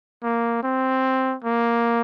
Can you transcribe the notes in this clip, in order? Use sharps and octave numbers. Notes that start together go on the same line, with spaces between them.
A#3
C4
A#3